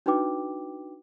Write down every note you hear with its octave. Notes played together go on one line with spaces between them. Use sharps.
D4 D#4 F#4 B4 G5 D6